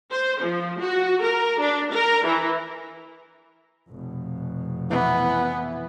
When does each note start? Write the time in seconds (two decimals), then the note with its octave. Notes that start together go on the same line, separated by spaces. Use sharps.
0.12 C5
0.43 F3
0.80 F#4
1.22 A#4
1.60 D4
1.93 A#4
2.25 E3
3.89 F1 B2
4.90 E3 B3